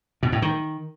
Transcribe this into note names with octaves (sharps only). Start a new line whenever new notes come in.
B2
A2
D#3